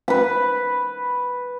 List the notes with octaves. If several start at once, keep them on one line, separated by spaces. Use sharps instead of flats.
B4 B5